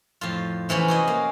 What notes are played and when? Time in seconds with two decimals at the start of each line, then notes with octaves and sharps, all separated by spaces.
0.21 F2 A2 F4
0.69 C3 E3 B3 C#4
0.88 F#4 G#4 D#5
1.08 A#3